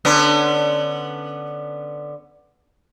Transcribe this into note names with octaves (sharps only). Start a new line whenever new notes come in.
D3 B3 C#4